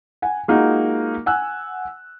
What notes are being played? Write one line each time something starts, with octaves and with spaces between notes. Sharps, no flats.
F#5 G#5
G#3 A#3 D#4 F4 F#4
F#5 G#5 E6 F#6